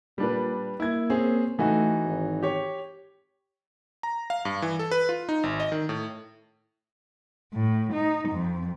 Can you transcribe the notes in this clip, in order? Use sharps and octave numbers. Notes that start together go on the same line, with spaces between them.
A#2 G3 D4 B4
A#3 E4 G#6
C4 C#4 G#4
E3 A3 D#4 F#4
G#1
G4 C#5
A#5
F5
G2
E3
A4
B4
F4
D#4
G#1
D#5
D#3
A2
A2
D#4
F2